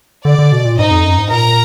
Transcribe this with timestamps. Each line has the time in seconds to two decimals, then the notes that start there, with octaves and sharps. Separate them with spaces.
0.25 D3 D5
0.39 D3
0.52 B2
0.65 A#2
0.78 G#2 D#4 D#5
0.91 F2
1.05 F#2
1.18 G#2
1.31 A#2 A#4 A#5